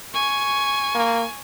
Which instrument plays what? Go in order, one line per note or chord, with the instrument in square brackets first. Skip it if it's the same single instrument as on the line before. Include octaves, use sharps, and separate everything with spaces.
[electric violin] G#5 [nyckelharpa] C#6
[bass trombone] A#3